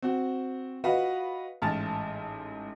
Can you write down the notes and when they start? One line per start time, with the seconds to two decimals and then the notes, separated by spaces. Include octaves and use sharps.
0.02 C4 F#4
0.84 F4 F#4 B4 D#5 F5
1.62 A1 G#2 A5 F6 A6